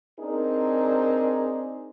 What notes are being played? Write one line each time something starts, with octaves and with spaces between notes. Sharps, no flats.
C4 D4 D#4 G#4 A#4